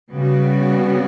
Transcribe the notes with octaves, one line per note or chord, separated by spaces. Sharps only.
C#3 G3 B3 F#4